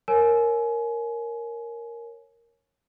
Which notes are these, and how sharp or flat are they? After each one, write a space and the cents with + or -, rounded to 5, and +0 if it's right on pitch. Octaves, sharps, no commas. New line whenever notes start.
A#4 +0 C#5 -15 G#5 +30